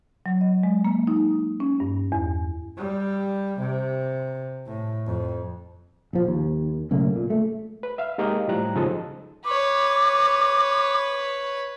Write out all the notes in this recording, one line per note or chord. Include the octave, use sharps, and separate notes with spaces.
F#3
D#5
G#3
A#3
D#4
C#4
G2
E2
G3
C3
A2
F2
A#1 F3
D#2
B1 C#3 A3 A#3
A#2
A3
B4
E5 F5
G#3 A#3 D#4 G4 D#5 F5
A2 F3 G3 A#5 F#6
C#2 C#3 F3 D#4 A4 D#5
B4 C#5 D6